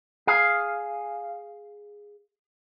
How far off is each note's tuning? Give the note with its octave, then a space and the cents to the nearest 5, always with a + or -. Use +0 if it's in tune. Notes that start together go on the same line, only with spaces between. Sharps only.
G#4 +0 F5 +0